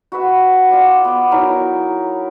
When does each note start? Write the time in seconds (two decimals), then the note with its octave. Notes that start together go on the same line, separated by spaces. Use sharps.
0.12 F#4 B4 E5
0.69 F4 D5 F#5
1.05 B3 D6
1.31 F#3 D#4 E4 A#4